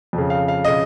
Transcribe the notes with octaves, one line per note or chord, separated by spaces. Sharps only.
F2 C#3
F5
F5
C#3 D#5